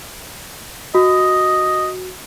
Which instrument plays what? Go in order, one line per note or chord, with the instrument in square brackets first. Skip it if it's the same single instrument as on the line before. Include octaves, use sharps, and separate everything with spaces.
[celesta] F#4 [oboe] D#5